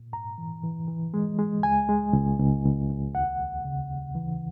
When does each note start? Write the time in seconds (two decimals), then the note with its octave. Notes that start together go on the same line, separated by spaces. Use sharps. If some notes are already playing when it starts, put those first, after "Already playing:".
Already playing: A#2
0.13 G#2 A#5
0.38 E3
0.63 E3
0.88 E3
1.14 G#3
1.39 G#3
1.63 C#2 G#5
1.89 G#3
2.14 C#2
2.39 C#2
2.65 C#2
2.89 C#2
3.15 D#2 F#5
3.40 D#2
3.65 C#3
3.91 D#2
4.15 E3